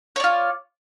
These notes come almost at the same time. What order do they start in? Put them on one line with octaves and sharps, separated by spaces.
C#5 D5 F4